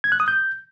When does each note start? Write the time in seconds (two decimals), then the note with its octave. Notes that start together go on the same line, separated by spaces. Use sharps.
0.04 G#6
0.12 F#6
0.20 D#6
0.28 G6